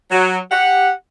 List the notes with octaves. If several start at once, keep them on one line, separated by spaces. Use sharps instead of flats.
F#3
G4 F#5